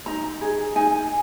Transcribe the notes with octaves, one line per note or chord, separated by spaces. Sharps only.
D#4 A#5
G#4
D#4 G#5